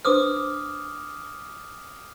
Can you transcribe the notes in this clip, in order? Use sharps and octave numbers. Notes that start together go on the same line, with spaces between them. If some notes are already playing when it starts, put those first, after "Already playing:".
D4 B4 C5 D6 D#6 F6